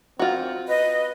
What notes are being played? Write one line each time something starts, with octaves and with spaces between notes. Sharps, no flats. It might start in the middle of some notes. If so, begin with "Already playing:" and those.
C4 F4 F#4
B4 D#5